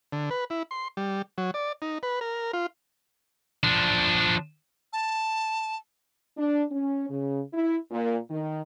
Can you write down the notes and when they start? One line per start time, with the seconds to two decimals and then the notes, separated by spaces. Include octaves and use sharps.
0.13 D3
0.31 B4
0.50 E4
0.71 C6
0.97 G3
1.38 F#3
1.54 D5
1.82 D#4
2.03 B4
2.21 A#4
2.53 F4
3.64 F3 D4
4.93 A5
6.37 D4
6.71 C#4
7.09 C#3
7.53 E4
7.90 A#2
8.30 D#3